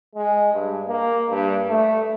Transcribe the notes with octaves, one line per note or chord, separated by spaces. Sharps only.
G#3
G2
A#3
G2
A3